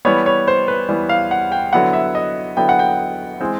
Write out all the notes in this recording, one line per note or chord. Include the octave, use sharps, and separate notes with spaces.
E3 G3 B3 C#5
C#5
C5
B4
E3 G3 B3
F5
F#5
G5
D3 F#3 B3 E4 F#5
E5
D#5
D3 F#3 B3 E4 G5
F#5
G5
E3 G#3 C4